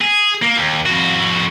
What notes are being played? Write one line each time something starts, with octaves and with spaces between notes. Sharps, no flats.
G#4
A#3
D#2
F2 F#4